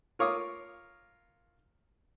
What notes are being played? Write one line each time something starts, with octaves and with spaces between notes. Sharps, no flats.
F4 A#4 C#5 F5 D6 D#6